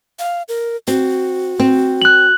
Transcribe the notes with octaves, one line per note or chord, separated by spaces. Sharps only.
F5
A#4
C4 F#4
C4
F#6 F#7